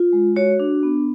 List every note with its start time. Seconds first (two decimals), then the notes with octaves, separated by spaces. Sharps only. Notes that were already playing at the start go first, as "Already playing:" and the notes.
Already playing: F4
0.13 G#3
0.36 F#4 C#5
0.60 D4
0.83 B3